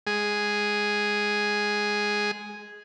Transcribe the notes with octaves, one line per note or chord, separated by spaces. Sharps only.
G#3 G#4